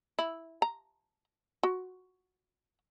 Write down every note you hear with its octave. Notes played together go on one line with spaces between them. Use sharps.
E4
A#5
F#4